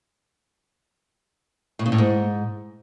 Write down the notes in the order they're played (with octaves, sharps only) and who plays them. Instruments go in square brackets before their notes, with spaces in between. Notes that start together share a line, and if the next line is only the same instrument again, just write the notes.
[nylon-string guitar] A2
C#3
A2
G#2